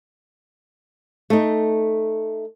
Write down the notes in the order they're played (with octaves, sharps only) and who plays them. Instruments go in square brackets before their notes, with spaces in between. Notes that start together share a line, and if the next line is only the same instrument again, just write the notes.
[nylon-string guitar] A3 D#4